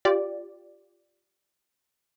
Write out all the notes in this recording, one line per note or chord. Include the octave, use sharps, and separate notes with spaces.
F4 G4 D5